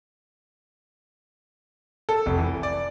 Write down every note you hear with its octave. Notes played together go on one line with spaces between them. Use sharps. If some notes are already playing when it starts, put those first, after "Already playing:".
A4
F1
E3
D5